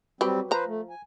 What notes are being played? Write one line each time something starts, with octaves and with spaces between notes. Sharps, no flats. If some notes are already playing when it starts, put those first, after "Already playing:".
F#3 G3 C4 G4 B4
F3 B4 C5 A#5
A3
G#5